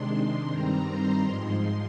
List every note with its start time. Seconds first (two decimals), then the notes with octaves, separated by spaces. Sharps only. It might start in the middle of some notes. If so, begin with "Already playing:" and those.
Already playing: C3 D#3 G#3 D4 C6
0.49 G2 D#3 G3 C4 A#5
0.86 C6
1.22 G#2 F3 G#3